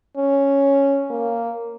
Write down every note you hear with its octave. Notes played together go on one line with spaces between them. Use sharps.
C#4
A#3